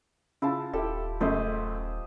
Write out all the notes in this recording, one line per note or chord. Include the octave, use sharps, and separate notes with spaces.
C#3 E4 F4 A5
D#1 E4 G4 A4
F#2 C#3 A3 C5 D#5